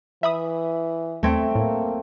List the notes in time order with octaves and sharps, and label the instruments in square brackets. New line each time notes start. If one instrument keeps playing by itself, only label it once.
[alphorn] E3 [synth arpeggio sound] E5 B5 D#6
[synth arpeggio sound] D#2 G#6 [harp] A3 C4
[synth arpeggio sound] A2 [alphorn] A#3